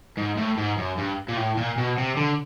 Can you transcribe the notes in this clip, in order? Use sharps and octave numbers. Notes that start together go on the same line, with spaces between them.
G#2
A2
G#2
F#2
G2
A#2
A2
A#2
B2
C3
D3